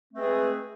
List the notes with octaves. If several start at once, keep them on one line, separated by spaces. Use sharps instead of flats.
G#3 A3 C4 G#4 B4